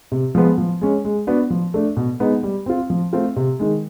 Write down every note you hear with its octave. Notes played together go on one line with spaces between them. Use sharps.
C3
F3 G#3 B3
F3
G#3 C#4
G#3
B3 D4 F#4
F3
A3 D4
B2
G#3 B3 D#4
G3
C4 F4
F3
A3 C4 F4
C3
D#3 G#3